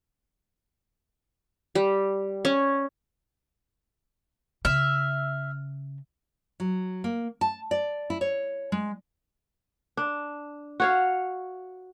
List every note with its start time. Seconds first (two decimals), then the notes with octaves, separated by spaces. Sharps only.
1.75 G3
2.45 C#4
4.65 C#3 E5 F6
6.60 F#3
7.04 A#3
7.41 A5
7.71 D5
8.10 E4
8.21 C#5
8.72 G#3
9.97 D4
10.80 F#4 C#5 F5